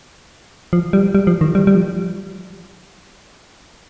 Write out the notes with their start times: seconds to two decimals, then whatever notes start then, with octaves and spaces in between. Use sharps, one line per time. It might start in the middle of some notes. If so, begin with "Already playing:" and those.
0.73 F3
0.93 G3
1.15 G3
1.27 F3
1.41 D#3
1.55 G3
1.67 G3
1.75 F3